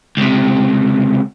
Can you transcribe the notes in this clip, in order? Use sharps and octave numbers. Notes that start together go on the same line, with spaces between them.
C#2 C3